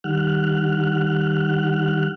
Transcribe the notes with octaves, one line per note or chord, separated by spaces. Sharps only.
D#3 G3 F#5 F6 F#6